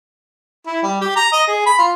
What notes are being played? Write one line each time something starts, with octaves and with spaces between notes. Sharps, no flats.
E4
G3
G4
A#5
D#5
G#4
B5
F4